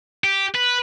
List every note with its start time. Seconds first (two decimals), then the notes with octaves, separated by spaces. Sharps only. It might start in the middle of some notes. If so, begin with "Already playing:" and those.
0.24 G4
0.54 B4